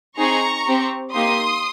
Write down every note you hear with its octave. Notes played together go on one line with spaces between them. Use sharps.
C4 D#4 G#4 A#5 C#6
C4 G4
A#3 D#4 G4 C6 D#6